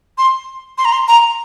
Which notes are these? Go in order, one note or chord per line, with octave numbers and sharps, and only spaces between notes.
C6
C6
A#5
C6
A#5